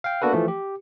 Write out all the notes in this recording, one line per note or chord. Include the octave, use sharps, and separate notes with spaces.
F5 G5
A#3 B3 D4 F#4 A4 B4
E3 F3 A3
G4